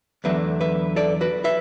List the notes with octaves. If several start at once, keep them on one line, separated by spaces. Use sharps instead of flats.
E2 D3 F#3 A3 B4 E5
B4 E5
A4 D5
F#4 B4
B4 E5